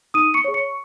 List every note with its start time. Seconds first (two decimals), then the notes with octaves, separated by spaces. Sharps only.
0.14 D#4 D#6 D#7
0.34 C#6 C#7
0.44 G#4 C#5
0.54 C#6 C#7